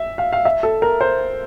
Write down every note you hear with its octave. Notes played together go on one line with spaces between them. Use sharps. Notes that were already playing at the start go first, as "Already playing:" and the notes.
Already playing: E5
F5
F5
E5
A4
A#4
C5